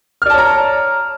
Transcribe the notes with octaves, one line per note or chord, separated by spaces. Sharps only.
C#5 D5 A5 A#5 F6